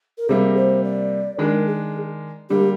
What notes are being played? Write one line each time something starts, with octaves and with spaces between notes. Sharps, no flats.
A#4
C3 G3 A#3 G#4
C5
D5
D#3 G#3 D4 A#4
G#4
D3 G3 A#3 G4